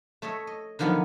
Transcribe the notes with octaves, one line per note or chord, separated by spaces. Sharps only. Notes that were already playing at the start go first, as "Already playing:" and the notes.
A3 C#5 D#5 E5
D#5
D3 D#3 F3 F#3 B3 D#4